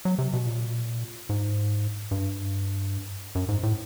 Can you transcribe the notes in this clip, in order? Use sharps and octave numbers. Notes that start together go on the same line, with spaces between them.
F#3
C3
B2
A#2
G#2
G2
F#2
G#2
A2